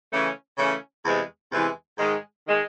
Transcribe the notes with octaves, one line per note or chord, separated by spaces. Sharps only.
C#3 E3 A3 C#4
C#3 E3 A3 C#4
E2 C3 E3 G#3
E2 C3 E3 G#3
G#2 D#3 G#3
D#3 G#3